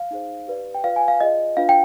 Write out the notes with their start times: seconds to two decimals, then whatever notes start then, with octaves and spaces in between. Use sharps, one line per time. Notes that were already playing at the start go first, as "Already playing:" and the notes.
Already playing: F5
0.11 D#4 G#4 C5
0.48 G4 B4 D5
0.75 G5
0.84 F4 B4 D5 F5
0.96 G#5
1.08 F5
1.20 F4 G#4 D5 D#5
1.57 D4 F4 B4 F5
1.69 G5